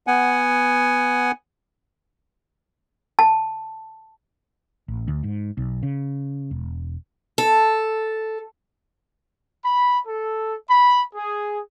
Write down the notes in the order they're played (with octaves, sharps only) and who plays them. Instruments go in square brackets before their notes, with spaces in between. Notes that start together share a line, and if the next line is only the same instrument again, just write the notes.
[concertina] B3 F#5 G#5
[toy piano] A5
[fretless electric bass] A1
D2
G#2
B1
C#3
E1
[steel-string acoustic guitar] A4
[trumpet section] B5
A4
B5
G#4